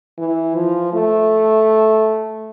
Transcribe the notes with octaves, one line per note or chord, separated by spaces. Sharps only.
E3
F3
A3